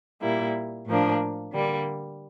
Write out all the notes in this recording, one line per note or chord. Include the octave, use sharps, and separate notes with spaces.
A#2 G3 A#3 E4
A2 F3 A#3 D4
D3 G3 A#3